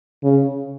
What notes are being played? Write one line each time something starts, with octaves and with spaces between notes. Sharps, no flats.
C#3